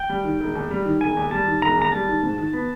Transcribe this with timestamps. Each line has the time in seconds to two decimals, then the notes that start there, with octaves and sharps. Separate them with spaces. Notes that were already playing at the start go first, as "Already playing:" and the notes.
Already playing: G5
0.10 G3
0.24 D#3
0.40 E1
0.55 D#2
0.71 G3
0.85 D#3
1.01 E1 G#5
1.17 D#2
1.31 G3 A5
1.47 D#3
1.62 E1 A#5
1.78 D#2 A#5
1.92 G3 A5
2.08 D#3
2.23 G#2
2.38 D#3
2.53 B3